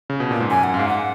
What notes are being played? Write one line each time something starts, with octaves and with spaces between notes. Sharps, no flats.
C#3
B2
A#2
G#2
F#2 G#5
F#5
F#2
G#2 F5
F#5